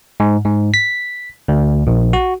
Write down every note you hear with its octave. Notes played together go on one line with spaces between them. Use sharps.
G#2
G#2
B6
D2
A#1
F#4